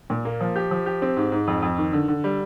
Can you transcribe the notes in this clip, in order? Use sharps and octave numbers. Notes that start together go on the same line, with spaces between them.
A#2
A#3
F3
G4
F3
G4
C4
G#2
G#2
F2
F2
D#3
D3
D3
G3